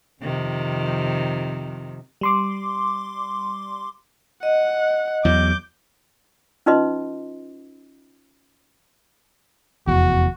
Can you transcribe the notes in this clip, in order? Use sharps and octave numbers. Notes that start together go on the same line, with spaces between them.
F2 C3 D#3
G3 C6 D6
D#5 F#5
E2 F#3 D6 G6
C#4 D#4 F4 B4 D#5 C6
F1 E2 F#4